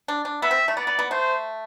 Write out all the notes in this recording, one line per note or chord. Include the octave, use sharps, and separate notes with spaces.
D4
D4
B3 E5
C4
A3
B3 D5
B3
B3
A3 C5